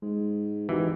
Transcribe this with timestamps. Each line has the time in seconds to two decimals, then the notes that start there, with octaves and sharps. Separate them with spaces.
0.02 G#2 G#3
0.69 G#1 E3 D#4 F#4 G4